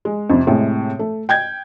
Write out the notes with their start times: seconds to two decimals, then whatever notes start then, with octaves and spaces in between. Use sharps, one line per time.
0.05 G#3
0.30 F2 C3
0.47 A2 C3 G#3
0.99 A3
1.29 G5 G6 G#6